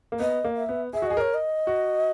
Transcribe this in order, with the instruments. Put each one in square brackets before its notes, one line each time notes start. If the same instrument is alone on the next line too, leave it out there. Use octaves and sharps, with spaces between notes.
[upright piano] A#3
[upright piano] B3 [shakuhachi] D#5
[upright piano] A#3
[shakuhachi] E5
[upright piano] B3
[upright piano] G#4 [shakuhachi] E5
[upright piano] F#4
[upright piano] G#4 [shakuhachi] D#5
[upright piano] A#4 [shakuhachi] C#5
[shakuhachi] D#5
[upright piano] F#4